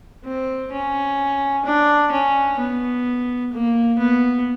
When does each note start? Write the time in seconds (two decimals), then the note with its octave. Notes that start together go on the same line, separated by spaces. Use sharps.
0.24 C4
0.72 C#4
1.65 D4
2.12 C#4
2.59 B3
3.53 A#3
3.99 B3